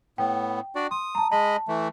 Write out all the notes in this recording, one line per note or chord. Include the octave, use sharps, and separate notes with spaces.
A2 B3 G5
D4 F#4 D5
C6 D#6
A5 A#5
G#3 D#5 A5 B5
E3 A3